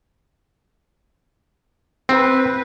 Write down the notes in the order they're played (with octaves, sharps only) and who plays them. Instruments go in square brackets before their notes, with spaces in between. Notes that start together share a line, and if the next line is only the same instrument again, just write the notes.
[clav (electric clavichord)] C4 [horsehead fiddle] B4